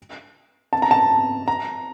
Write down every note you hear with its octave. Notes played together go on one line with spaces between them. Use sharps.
A5
A#5
A5
A#5